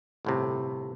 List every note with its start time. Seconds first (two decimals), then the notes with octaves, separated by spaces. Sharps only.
0.25 G1 A2 C3